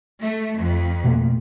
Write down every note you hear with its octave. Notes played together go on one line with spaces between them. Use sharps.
A3
F2
B2 A3 A#3